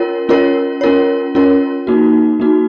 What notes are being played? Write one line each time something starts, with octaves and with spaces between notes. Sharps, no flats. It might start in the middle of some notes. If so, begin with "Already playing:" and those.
Already playing: C#4 F4 A#4 C#5
C#4 F4 A#4 C#5
C#4 F4 A#4 C#5
C#4 F4 A#4 C#5
A#3 D#4 F#4
A#3 D#4 F#4